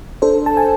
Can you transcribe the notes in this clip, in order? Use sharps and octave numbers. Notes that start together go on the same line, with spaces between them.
D4 A4 C5
A5
G#5